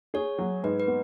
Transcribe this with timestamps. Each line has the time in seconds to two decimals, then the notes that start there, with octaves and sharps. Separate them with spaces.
0.14 G#4 C#5
0.38 F#3
0.64 G#2 B4
0.80 B4
0.88 B3